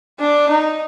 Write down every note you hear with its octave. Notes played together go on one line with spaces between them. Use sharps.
D4
D#4